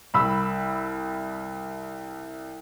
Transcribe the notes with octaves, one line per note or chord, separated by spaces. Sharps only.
C2 B5 E6